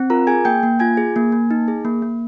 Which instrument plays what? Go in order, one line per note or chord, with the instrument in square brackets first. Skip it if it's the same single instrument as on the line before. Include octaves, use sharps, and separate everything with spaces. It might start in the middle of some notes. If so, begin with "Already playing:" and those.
Already playing: [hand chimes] C4
F4 A#4 A#5
G#4 G#5 G#6
A#3 G5 G6
A#3
F4 G#5 G#6
G#4
A#3
A#3
D#4
G#4
A#3
A#3